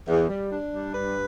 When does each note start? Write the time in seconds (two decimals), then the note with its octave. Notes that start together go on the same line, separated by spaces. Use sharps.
0.08 E2
0.29 G3
0.52 D4
0.74 G3
0.94 G2 B4